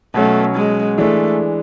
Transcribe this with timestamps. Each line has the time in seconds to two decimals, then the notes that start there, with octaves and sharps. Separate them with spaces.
0.14 B2 F#3 A3 C#4
0.56 G#3
0.98 E3 G#3 A3 D4